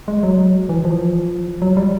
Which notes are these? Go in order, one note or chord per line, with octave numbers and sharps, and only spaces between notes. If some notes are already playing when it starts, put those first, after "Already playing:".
G#3
F#3
E3
F3
F#3
G3